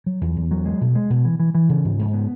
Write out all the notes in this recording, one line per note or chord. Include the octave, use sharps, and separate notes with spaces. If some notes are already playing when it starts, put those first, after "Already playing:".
F#3
E2
E2
F#3
G#3
B2
G#3
B2
E3
E3
E3
C#3
G#2
G#2
B3